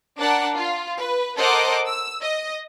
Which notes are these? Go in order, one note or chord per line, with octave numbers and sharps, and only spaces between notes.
D4 A#4 D5 F#5 A5
F4
B4
A4 A#4 C5 D#5 F#5 D6
E6
D#5